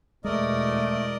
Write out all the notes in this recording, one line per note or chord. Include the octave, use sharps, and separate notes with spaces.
E2 B2 G#3 A3 A#4 D5 D#5